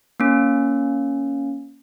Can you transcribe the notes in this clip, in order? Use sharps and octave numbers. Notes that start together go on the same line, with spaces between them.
A#3 C#4